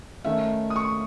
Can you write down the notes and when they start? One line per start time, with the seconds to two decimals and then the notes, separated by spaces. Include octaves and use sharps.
0.24 D#3 A3 C#4 E5
0.70 D#6
0.76 C#6